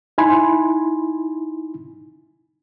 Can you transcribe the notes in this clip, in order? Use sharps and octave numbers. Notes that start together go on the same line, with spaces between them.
D#4 E4 G#5 B5 C6